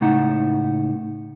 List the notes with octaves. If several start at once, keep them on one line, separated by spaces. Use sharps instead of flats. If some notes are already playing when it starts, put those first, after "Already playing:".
C#2 A2 D#4 F#5